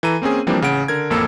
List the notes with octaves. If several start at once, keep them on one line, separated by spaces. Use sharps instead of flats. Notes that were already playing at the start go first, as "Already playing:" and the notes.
E3 A4 A#5 D#7
A#3 C4 C#4 G#4
E3 F3 G3 A#3 C4 D4
A1 C#3 F#5 D7
D3 A#4 G#6
A1 F2 A#3 A4 E6 C#7